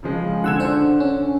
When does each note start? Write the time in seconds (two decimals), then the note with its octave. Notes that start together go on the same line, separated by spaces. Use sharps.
0.03 C#3 F3 G#3
0.44 D3 F#5 E6 F#6 G#6 E7
0.59 D4 C5 F#5
1.00 C#4